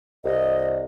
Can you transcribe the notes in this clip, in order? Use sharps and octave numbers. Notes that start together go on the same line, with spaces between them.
C2 D#5